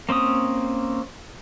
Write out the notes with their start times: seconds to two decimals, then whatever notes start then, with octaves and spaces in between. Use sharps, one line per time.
0.09 A#3 C4 C#4 D#6